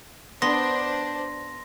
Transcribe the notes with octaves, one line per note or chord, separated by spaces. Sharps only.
B3 D4 C5 C6 A#6